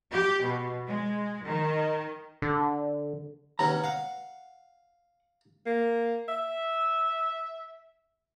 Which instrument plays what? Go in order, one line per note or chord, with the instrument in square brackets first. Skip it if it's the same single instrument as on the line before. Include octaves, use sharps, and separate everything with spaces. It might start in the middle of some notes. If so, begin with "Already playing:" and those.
[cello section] G4
B2
G#3
D#3
[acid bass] D3
[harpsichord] D#2 B3 C#4 [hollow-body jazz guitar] C3 A#5
[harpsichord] F5 [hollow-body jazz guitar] F#5
[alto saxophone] A#3
E5